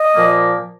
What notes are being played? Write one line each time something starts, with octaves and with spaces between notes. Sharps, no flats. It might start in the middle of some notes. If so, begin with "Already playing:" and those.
Already playing: D#5
A#2 F3 A#3